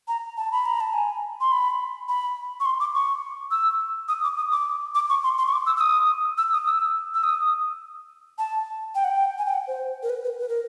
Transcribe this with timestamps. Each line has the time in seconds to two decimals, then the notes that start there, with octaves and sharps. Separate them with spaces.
0.08 A#5
0.37 A5
0.52 B5
0.66 A#5
0.80 A5
0.93 G#5
1.41 C6
1.52 B5
2.09 B5
2.60 C#6
2.65 C6
2.80 D6
2.95 C#6
3.51 E6
4.08 D#6
4.23 D6
4.37 D#6
4.52 D6
4.95 D6
5.10 C#6
5.24 C6
5.38 C6
5.47 C#6
5.53 D6
5.66 E6
5.77 E6
5.80 D#6
6.38 E6
6.53 D#6
6.67 E6
7.14 E6
7.24 D#6
8.38 A5
8.95 G5
9.04 F#5
9.11 G5
9.38 G#5
9.46 G5
9.54 F#5
9.68 C5
10.03 A#4
10.10 B4
10.24 B4
10.39 B4
10.48 A#4